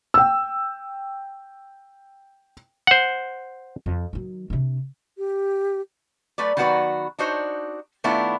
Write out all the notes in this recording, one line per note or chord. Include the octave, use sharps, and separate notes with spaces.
G5 E6
C5 F#5
F2
D#3 F#3
C3 D4
G4
F#3 A3 B4 D5
D#3 F#3 B3 F#4 B4 D5
D4 D#4 F#4 C5 C#5
D#3 A3 B3 D4 E4 F4